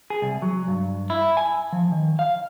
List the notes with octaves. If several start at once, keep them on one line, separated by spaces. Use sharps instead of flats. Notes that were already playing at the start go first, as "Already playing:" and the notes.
G#4
C2
F#3
G2
E4
G#5
F3
D#3
F5